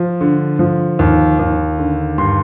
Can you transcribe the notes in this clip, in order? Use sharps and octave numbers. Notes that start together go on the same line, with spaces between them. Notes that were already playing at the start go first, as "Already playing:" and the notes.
Already playing: F3
D3
F3
D#2
D#2
D3
G2 C6